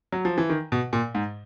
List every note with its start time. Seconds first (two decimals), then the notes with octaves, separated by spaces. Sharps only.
0.12 F#3
0.25 F3
0.38 E3
0.50 D#3
0.72 B2
0.93 A#2
1.15 G#2